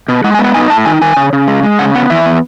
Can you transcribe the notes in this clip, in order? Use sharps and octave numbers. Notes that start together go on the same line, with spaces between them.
B2
G#3 F#5
G#5
B3
F#5
D#4 G#5
A2 A5
D#3 G#5
D#3 G#5
C#3
C#3
G#3
G#3
C#3 F#5
B3 F#5
E3 E5
B3